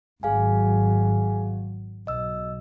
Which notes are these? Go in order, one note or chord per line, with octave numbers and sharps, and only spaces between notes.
G#1 F#3 G#4 F5 G#5
B1 D#5 E6